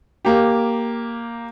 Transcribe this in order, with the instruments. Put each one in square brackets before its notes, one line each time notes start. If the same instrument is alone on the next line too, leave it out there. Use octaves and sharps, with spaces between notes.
[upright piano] A#3 G4